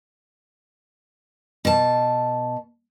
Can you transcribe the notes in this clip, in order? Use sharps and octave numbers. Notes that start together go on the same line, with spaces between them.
B2 A5